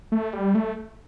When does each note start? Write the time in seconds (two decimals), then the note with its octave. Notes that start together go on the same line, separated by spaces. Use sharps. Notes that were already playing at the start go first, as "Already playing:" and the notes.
0.12 A3
0.33 G3
0.55 A3